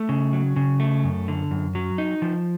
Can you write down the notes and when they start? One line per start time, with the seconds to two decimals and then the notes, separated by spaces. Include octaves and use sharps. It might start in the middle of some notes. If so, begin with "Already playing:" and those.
Already playing: A3
0.09 C#3
0.33 F#3
0.56 C#3
0.80 A3
1.04 F#2
1.28 D3
1.51 F#2
1.75 F#3
1.98 D#4
2.22 F3